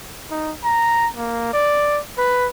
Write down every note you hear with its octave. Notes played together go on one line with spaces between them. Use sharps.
D#4
A#5
A#3
D5
B4